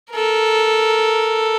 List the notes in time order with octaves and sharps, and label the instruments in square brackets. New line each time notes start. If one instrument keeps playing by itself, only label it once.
[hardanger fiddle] A4 A#4